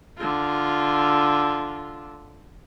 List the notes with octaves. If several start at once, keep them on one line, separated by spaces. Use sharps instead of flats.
D3 F4